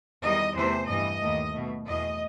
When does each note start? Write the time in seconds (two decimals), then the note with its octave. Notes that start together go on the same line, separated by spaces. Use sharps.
0.23 E2 D#3 G3 D#5
0.55 E2 C3 E3 A3 C5
0.88 G2 E3 G3 D#5
1.20 D#2 D#3 A3
1.53 B2 A3
1.86 E2 B2 A3 D#5